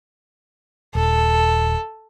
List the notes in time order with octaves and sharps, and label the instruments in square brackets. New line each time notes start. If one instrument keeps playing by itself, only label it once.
[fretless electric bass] D#1 [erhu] A4